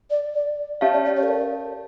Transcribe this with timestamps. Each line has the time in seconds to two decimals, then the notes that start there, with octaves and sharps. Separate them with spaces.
0.10 D5
0.35 D5
0.81 C#4 G4 C#5 E5 F5 A5
0.93 D5
1.05 D5
1.16 C#5
1.23 A4
1.28 A#4